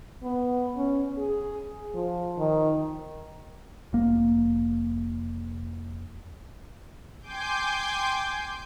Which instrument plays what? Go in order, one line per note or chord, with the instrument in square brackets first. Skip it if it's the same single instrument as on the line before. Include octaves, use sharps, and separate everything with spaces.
[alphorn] B3
C#4
G#4
F3
D#3
[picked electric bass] F1 A#3
[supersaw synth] G5 G#5 C6 D6 G6